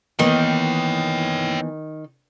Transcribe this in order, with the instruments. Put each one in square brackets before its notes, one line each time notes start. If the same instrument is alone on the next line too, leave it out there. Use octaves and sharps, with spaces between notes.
[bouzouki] D#3 [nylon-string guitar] E3 A#3 B3 [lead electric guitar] C#5 G5